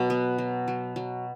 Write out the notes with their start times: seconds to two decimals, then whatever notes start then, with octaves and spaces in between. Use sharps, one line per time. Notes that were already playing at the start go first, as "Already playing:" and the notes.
Already playing: B2 F#3 F#4
0.10 B3
0.38 F#3
0.68 F#3
0.96 F#3